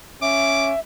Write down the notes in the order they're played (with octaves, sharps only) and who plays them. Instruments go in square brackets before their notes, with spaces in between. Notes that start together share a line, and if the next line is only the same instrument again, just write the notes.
[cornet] C#4 [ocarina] E5 [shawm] D6